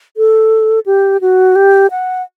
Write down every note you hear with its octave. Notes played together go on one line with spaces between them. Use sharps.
A4
G4
F#4
G4
F#5